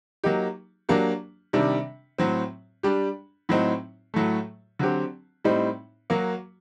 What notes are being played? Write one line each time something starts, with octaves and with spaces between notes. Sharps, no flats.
F#3 A#3 D#4 G4
F#3 A#3 D4 G4
C3 D#3 G3 D4
A2 F#3 C4
G3 D4 G4
A2 F#3 C4 D#4
A2 F#3 A3
D3 F#3 C4 G4
A2 G3 C4 D#4
F#3 A#3 F#4